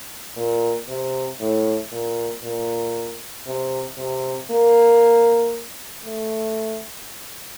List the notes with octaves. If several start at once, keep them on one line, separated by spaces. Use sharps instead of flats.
A#2
C3
A2
A#2
A#2
C3
C3
A#3
A3